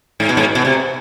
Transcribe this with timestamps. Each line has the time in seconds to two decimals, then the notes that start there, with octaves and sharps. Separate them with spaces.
0.20 G#2
0.29 B2
0.37 G#2
0.55 B2
0.65 C3